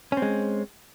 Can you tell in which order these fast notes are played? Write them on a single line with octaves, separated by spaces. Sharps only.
C#4 C4 G#3